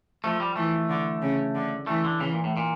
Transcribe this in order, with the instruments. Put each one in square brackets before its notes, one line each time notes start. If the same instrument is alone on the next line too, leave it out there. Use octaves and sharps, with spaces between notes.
[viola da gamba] F3 [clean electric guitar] A3
[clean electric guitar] G3
[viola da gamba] E3 [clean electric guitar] A3
[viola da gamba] D3
C#3
D3
[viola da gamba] E3 [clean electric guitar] A3
[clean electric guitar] D3
[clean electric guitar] C#3 [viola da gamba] E3
[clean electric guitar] A#2
A2
A#2